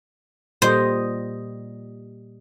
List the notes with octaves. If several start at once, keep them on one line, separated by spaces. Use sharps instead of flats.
A#2 G3 C5 D#5